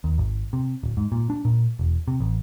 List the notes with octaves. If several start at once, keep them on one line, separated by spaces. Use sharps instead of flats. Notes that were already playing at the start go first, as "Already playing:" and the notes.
D#2
G#1
C3
D1
G#2
A#2
D4
A#2
E1
C3
A1